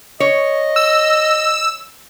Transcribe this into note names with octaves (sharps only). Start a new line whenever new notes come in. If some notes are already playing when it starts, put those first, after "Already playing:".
C#5 D#5
E6